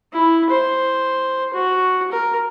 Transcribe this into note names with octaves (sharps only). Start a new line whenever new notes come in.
E4
C5
F#4
A#4